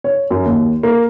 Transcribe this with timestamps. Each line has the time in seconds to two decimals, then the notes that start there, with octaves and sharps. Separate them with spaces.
0.04 C#5
0.31 F#2
0.46 D#2
0.83 A#3